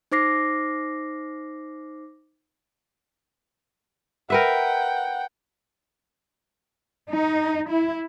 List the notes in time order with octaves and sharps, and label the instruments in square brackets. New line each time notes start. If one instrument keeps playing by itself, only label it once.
[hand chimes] D#4 C5 D6 A#6 C7
[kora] A#4 B4 E5 [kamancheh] F#5 G5
[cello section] D#4
E4